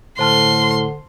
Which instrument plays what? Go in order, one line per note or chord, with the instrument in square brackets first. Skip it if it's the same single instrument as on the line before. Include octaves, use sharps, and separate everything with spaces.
[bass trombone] A2 [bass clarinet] D3 [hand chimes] C5 A5 F6 [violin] C6